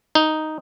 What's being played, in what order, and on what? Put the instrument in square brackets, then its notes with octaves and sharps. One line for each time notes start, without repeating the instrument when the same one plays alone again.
[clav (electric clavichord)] D#4